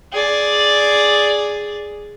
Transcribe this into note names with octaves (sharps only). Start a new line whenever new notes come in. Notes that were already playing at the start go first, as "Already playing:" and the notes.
G#4 D5